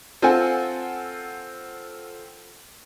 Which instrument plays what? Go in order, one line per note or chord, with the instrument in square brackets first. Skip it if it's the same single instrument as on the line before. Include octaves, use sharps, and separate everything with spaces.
[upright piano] C4 F4 A4 C5 F#5 G#5